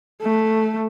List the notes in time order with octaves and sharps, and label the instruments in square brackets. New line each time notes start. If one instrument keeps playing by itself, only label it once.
[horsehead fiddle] A3